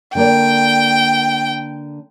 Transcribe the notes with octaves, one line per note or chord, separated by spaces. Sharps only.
D3 A#3 D5 G5